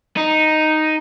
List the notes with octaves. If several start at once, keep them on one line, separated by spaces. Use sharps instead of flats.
D#4